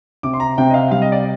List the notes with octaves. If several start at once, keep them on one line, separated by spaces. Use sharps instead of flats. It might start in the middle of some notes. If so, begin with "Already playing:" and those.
C3 D6
C6
A#5
C3 G5
D#5
F5
G3 F5
D#5
D5